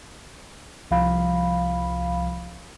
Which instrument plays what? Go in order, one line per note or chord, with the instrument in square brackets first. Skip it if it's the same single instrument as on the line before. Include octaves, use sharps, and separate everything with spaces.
[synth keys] C2 F3 F5 B5